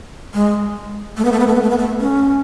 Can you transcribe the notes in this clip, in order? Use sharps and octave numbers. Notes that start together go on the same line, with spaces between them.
G#3
A3
B3
A3
B3
A3
B3
A3
B3
A3
C#4